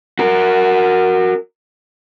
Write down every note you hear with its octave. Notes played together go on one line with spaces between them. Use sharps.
F#4 A#4